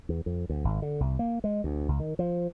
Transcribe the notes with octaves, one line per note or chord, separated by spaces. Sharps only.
E2
F2
D2
G#1
D3
C2
A#3
G#3
D2
C#2
D#3
F3